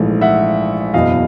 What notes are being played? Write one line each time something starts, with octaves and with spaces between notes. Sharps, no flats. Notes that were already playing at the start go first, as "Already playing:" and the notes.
Already playing: A#1 G#2 E3 A3
E5 F#5
F#1 E2 B2 D#5 F5